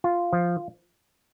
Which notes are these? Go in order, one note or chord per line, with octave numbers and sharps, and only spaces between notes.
F4
F3